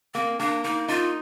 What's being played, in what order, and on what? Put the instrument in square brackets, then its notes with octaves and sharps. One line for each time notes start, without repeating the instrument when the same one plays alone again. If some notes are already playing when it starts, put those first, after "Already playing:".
[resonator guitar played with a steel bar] A#3 [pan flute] C4
[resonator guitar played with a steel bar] A#3 [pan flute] D4
[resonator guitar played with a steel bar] A#3 [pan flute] D#4
[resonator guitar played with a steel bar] D#4 [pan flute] F4